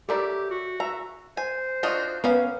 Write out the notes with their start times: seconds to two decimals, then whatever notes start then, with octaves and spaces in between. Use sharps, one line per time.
0.09 F#3 E4 G4 A4 A#4 D5
0.50 F#4
0.80 E5 A#5
1.37 C5 G#5
1.83 D4 F4 F#4 D#5
2.24 A#3 B3 C#4 B4 F5